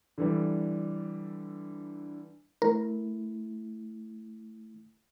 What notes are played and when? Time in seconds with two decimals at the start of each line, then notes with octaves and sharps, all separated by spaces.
0.18 D3 E3 G3
2.62 A3 E4 A#4